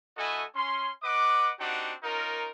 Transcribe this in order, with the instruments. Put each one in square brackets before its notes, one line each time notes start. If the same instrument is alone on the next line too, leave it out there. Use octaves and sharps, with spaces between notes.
[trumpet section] A3 E4 F#4 A4 D#5 G#5
C#4 C6
B4 D#5 F#5 D6
C4 D4 D#4 F#4 G4 F#5
C#4 D#4 F4 A#4